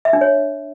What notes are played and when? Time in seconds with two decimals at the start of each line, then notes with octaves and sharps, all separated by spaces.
0.05 E5
0.13 D4
0.21 C#5